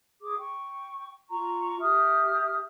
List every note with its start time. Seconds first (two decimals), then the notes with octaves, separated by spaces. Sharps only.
0.21 G#4 D6
0.38 G5 C#6
1.29 F4 A#5 C#6
1.80 G4 E5 D#6 F6